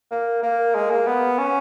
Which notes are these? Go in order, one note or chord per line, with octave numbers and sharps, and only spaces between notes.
A#3
A#3
G#3
A#3
B3
C#4